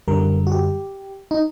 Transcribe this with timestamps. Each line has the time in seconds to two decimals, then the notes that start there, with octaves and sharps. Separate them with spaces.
0.08 F#2 D3 G3 A#4
0.47 F#4
0.52 G4
1.31 D#4